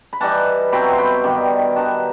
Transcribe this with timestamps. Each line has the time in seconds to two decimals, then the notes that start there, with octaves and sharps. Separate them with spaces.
0.13 B5
0.20 E3 G3 D#4 F#5 A5
0.72 B2 F#3 C4 E4 G5 B5
0.93 C6
0.98 G5 B5
1.23 G2 D#3 G3 G5 B5
1.76 D#3 G3 B3 D#4 F#5 A5